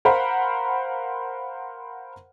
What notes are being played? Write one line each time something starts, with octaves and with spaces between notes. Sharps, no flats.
A#4 C5 F5 F#5 B5